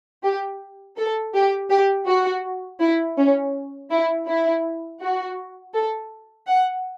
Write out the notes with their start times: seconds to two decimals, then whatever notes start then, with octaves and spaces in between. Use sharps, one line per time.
0.23 G4
0.97 A4
1.34 G4
1.70 G4
2.07 F#4
2.80 E4
3.18 C#4
3.90 E4
4.27 E4
5.01 F#4
5.74 A4
6.48 F#5